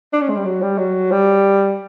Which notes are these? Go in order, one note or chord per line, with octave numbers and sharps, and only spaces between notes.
D4
C#4
G#3
G3
F#3
G3
F#3
G3